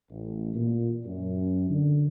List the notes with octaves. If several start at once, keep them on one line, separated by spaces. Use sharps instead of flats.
A1
A#2
F#2
D3